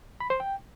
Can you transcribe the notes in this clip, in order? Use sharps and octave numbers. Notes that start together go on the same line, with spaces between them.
B5
C5
G5